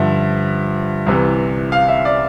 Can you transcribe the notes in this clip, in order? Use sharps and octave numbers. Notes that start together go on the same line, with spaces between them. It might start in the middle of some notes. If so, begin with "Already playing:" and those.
Already playing: G2 D3 F3 E5
C2 C3 E3
F5
E5
D5